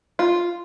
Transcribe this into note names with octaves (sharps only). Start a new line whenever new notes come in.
F4